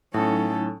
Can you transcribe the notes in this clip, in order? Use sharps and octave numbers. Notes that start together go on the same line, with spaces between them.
A2 F#3 C#4 D#4 A4